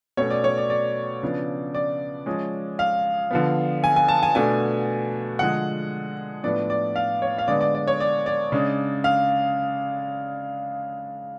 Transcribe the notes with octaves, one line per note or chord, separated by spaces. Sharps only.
B2 A3 C#4 C#5
D5
C#5
D5
D5
C#3 F3 B3 D4
D5
F3 G#3 C#4
F5
D3 F3 B3
G#5
G#5
A5
G#5
B2 A3 D4 G#5
D3 F3 G#3 F#5
A2 F3 B3 D4 D5
D5
F5
C#5
F5
D3 G#3 B3 D4 D5
D5
D5
C#5
D5
D5
C#3 G#3 D4
F5